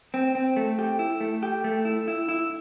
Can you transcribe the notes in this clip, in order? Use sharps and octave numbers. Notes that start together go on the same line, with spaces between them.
C4
C4
A3
G4
E4
A3
G4
A3
E4
E4
E4